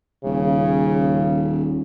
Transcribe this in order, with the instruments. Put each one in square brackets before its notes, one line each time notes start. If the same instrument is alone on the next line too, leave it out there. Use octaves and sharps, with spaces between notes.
[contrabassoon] D#1 [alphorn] C#3